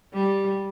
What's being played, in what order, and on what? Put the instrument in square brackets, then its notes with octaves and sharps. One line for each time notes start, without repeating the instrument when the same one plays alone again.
[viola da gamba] G3